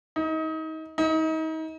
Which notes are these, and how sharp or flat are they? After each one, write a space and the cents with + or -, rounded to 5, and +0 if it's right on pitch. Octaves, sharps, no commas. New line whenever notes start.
D#4 +30
D#4 +35